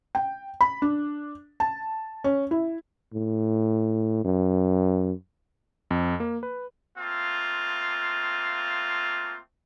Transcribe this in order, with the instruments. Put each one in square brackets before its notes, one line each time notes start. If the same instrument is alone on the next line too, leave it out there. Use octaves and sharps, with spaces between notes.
[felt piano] G5
B5
D4
A5
C#4
E4
[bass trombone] A2
F#2
[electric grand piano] F2
A#3
B4
[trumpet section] A3 A#3 C4 F4